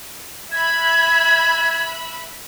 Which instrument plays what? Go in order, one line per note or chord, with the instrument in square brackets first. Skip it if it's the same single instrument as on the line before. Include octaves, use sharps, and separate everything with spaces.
[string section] E5 B5 F#6 [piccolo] G#6